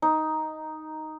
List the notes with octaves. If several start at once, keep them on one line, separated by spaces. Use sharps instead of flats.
D#4